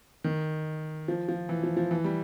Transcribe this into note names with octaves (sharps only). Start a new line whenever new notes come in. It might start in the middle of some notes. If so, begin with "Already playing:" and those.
D#3
F3
F3
E3
F3
F3
E3
G3